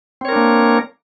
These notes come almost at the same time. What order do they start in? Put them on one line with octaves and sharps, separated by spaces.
C4 C#5 A#4 D4 A#3